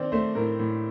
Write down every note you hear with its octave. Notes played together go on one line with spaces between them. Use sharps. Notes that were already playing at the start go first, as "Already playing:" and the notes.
Already playing: D#3 C4 D5
A3 C5
A2 A#4
A2